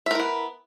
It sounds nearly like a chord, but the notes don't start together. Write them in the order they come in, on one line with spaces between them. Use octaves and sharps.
E5 A#4 E4 B3